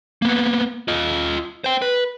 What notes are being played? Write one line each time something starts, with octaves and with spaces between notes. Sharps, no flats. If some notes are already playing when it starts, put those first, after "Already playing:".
A#3 B3
F4 D#5
C5 G5
B4